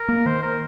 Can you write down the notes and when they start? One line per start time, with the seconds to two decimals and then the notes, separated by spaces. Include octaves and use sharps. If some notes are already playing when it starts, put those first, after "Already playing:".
Already playing: A#4
0.09 A#3
0.26 D#3 C5
0.42 A#4